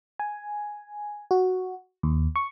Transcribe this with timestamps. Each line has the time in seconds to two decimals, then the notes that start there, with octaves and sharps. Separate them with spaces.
0.19 G#5
1.31 F#4
2.03 D#2
2.36 C#6